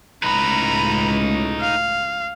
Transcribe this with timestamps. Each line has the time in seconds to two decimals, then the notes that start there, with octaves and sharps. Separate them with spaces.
0.23 C#2 A2 D#4 B4 A#5 B5
1.61 F5